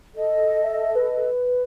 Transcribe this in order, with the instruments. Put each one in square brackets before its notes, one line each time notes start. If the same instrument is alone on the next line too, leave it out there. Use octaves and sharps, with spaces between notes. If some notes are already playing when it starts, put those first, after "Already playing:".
[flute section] A4 D#5
[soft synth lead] E5
B4